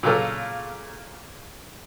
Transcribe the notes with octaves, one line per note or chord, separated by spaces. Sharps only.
A#2 C#3 F#3 F4 A4 A#4